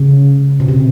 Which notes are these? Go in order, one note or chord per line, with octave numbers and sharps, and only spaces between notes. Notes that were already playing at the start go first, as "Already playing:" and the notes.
Already playing: C#3
B2
C3